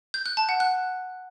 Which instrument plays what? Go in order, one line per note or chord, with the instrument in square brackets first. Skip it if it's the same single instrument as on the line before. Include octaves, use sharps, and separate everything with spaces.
[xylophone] G6
F#6
A5
F#5
F#6